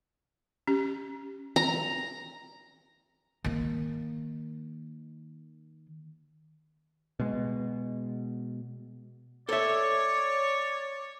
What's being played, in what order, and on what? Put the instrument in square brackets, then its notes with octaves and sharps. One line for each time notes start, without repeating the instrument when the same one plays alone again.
[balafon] C#4 G4
[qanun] A#5
[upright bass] D#3 A#3
[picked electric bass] B2 G#3
[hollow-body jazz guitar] A4 E5 [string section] C#5 [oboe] D5